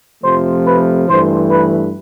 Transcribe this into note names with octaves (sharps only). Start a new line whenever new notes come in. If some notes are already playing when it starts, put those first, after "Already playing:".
F2 C3 F3 A3 C5
B4
G2 E3 A3 C5
B4